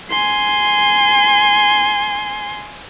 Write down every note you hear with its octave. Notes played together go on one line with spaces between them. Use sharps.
G#5 C6